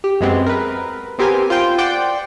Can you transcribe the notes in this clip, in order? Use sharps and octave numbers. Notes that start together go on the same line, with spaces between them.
G4
F#2 G#3 B3 C4
A#4 B4
B3 C4 G4 A#4 G#5
F4 C5 G5
C5 D5 F#5 G5